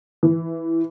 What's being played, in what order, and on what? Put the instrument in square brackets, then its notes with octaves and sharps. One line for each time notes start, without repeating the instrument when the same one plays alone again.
[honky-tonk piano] E3